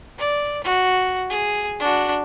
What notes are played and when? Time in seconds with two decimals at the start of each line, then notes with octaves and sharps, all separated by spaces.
0.19 D5
0.64 F#4
1.30 G#4
1.80 D4 F#4